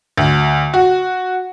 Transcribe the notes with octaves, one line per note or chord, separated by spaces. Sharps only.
D2
F#4